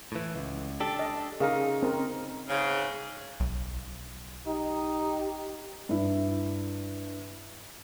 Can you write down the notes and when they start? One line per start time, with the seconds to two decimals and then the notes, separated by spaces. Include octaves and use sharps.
0.12 A2 E3
0.35 C#2
0.80 D4 G4 A4
0.99 D#5
1.40 C#3 D#4 G#4 A#4 F5
1.83 C4 A#4
2.49 G#2 C#3
3.40 B1
4.47 D#4 G4
5.89 G2 E4